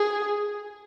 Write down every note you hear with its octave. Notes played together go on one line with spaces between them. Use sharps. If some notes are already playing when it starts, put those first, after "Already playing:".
Already playing: G#4